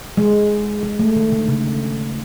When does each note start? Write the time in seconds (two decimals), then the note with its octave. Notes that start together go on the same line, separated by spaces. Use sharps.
0.17 G#3
0.83 G#3
0.99 A3
1.16 D#3
1.32 D3
1.48 C#3